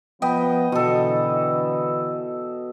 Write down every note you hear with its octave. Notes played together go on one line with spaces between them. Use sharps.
F3 B3 B4 D#5 G5
B2 D3 E3 A4